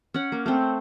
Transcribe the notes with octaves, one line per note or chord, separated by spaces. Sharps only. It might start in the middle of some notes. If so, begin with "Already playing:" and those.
C#4 F#5
A#3
A3 C4